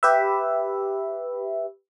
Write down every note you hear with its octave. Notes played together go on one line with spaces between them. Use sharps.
G4 B4 E5